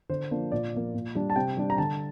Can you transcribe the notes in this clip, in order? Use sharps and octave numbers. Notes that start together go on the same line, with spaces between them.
D3 C5
F3 A#3 D4
A#2 D5
F3 A#3
A#2
G3 D4
A5
C3 G5
G3 D4
A#5
D3 A5